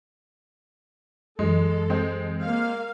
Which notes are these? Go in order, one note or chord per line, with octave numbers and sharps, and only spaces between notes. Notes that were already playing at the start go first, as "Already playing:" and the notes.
F#2 E3 G#3 A4
G#3 C4
A#3 F5